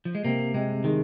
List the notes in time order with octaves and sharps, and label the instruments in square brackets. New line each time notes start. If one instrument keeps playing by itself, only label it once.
[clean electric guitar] F3
G#3
[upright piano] C3 [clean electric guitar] A#3
[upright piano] C3 [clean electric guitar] G#3
[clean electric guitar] D#3 [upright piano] G#3